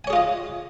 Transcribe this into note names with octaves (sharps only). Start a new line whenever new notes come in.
F4 G#4 C#5 D#5 G#5